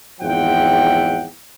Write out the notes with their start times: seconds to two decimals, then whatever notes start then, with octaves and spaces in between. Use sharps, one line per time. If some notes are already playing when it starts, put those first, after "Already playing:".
0.21 G#1 E2 F3 E5 F#5 G5